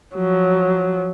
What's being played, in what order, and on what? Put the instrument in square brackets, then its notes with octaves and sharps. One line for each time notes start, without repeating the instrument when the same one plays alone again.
[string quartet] F3 F#3